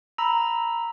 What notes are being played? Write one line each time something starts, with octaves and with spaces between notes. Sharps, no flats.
A#5 B5 E6